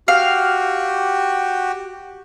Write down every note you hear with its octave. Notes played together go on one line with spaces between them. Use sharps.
F#4 G4 F5